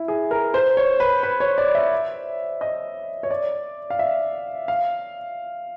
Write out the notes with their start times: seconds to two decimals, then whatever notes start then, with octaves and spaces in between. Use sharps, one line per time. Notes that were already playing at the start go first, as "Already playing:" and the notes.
Already playing: E4
0.08 G#4
0.31 A#4
0.54 C5
0.77 C#5
1.00 B4
1.23 B4
1.40 C#5
1.58 D5
1.75 E5
2.61 D#5
3.23 C#5
3.31 D5
3.90 F5
3.99 E5
4.68 F5